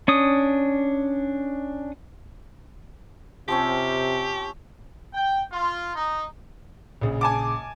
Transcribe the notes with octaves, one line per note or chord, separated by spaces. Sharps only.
C#4 D4 D#6
C3 F3 C4 C#4 G4
G5
F4
D#4
A#1 C#3
G#5 A5 D6